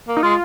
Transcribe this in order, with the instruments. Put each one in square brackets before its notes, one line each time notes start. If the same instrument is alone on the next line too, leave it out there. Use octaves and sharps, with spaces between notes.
[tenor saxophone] A#3
[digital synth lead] D#4
[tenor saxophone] G#3 [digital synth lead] F4